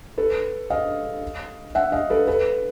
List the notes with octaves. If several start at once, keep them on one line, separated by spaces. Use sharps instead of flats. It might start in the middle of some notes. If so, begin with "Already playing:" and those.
A4 B4
D#5 F5
E5 F#5
D#5 F5
A4 B4
A4 B4